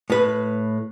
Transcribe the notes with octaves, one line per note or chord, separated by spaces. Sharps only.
A2 B4